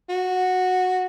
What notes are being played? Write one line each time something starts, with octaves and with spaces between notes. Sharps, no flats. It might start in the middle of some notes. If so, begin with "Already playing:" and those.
F#4